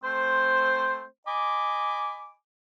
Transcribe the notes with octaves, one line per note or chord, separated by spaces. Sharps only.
A3 C4 C5
D#5 G#5 B5 D6